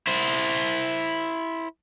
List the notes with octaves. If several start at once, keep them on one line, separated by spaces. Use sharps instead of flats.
E4 C5